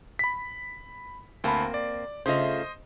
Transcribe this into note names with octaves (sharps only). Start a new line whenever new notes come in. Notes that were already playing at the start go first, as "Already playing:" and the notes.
B5 B6
D2 A#3 C4 A5 B5
D5
C#3 A3 F4 C5 D#5